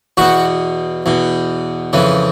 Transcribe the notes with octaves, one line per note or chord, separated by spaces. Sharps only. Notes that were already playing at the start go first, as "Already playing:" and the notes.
E2 B2 F#4
E2 B2
F2 C#3 E3